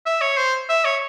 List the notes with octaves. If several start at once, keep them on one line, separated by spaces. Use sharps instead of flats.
E5
C#5
C5
E5
C#5